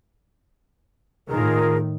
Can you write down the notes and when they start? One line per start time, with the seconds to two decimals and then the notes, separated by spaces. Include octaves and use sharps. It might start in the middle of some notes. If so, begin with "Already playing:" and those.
1.28 A2 D#3 F4 G#4 A#4